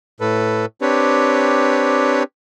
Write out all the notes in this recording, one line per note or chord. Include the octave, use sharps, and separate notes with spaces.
A2 A4 B4
C4 D4 G4 B4 C#5